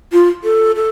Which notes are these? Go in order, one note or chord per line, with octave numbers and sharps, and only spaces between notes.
F4
A4
A4